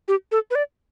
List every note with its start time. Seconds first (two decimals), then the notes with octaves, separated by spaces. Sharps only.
0.08 G4
0.32 A4
0.51 B4
0.55 D5